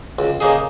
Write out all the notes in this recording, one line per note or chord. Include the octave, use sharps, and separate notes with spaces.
C#2
C#3 A#3 D#4 G#4